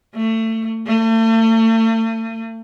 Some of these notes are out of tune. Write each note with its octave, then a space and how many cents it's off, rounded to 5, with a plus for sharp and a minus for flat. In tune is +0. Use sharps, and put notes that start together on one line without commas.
A3 +25
A3 +40